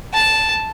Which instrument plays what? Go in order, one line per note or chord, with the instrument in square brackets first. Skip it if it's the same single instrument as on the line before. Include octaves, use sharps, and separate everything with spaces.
[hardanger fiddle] A5